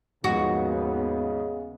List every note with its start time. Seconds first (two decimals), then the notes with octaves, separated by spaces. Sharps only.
0.24 D#2 G#2 C#3 F3 B3 F#4